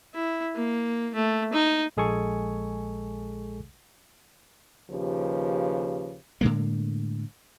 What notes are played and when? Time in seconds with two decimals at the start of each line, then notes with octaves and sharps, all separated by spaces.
0.14 E4
0.55 A#3
1.15 A3
1.53 D#4
1.97 A#1 G#3 G#4 A4 G#5 C#6
4.90 D#2 C#3 F3 G4 B4
6.41 A2 D3 G#3 A#3